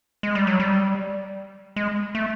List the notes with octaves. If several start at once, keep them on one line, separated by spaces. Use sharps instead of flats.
G#3
G3
F#3
G3
G#3
A3